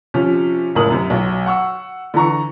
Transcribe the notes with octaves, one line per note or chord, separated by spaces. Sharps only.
C3 F3 C#4
F#1 C#2 A2 A#4 D#6 F#7
F#2 C3
B1 F#3
F#5 C#6 E6
D3 E3 A#5 C#6